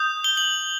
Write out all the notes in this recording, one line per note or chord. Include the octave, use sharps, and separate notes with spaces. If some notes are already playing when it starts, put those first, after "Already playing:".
Already playing: D#6 G6
G7
F#7